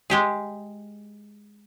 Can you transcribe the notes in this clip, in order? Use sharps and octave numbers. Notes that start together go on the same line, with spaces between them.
G#3 G4 G#4